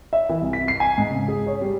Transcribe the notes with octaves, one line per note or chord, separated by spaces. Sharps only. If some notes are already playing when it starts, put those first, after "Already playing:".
E5
E3
C2
B6
C7
G#5
G#2
C#3
G#4
C#5
G3